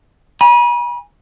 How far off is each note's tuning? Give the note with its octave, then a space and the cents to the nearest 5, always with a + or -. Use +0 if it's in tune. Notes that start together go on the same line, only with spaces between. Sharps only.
G#5 -10 B5 -40